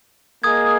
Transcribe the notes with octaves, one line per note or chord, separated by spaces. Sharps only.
A#3 G#4 D#5 D#6 G#6